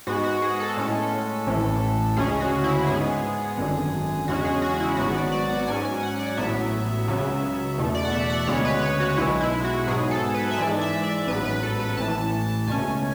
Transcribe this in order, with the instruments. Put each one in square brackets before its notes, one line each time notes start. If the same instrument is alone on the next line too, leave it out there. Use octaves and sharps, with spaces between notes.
[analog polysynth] G#2 G#3 B3 F#4
F#4
G#4
A4
A2 G#3 C#4
A1 A2 E3
D2 C#3 G#3 C#4 G#4
F#4
E4
G#2 G#3 B3 G#4
G#1 F#2 D3
E2 C#3 G#3 C#4 F#4
G#4
F#4
F#4
E4
G#1 G#2 F#3 B3 F#4
D5
D5
F#5
G#2 F#3 C#4 G#5
G#5
F#5
D5
A1 A2 F#3 B3 E5
C#2 C#3 F#3 B3
E2 B2 A3
D5
F#5
E5
F#5
D2 C#3 G#3 B3 C#5
B4
C#5
F#4
B1 B2 G#3 E4
E4
F#4
G#2 F#3 B3 G#4
A4
B4
E5
G#2 E3 G#3 D5
E5
D5
A1 G#2 F#3 B3 B4
B4
A4
B4
A1 A2 E3 A5
C#2 B2 A3 C#4 G#5